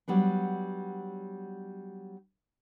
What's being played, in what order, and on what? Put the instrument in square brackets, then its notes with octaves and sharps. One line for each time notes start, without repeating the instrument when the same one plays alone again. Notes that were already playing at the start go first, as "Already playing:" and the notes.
[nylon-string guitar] F#3 G3 B3 D4